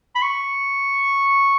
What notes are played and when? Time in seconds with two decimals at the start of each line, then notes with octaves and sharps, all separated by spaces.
0.15 B5
0.22 C#6